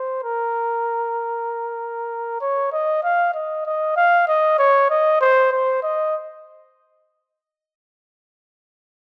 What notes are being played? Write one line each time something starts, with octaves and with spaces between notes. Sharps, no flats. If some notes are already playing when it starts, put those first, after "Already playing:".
Already playing: C5
A#4
C#5
D#5
F5
D#5
D#5
F5
D#5
C#5
D#5
C5
C5
D#5